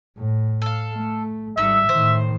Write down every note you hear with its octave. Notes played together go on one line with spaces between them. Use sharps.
A2
A4 F5
A3
G#1 G3 A3 D#4 E5 E6
A2 D#3 C5